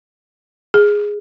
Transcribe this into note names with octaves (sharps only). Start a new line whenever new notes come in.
G#4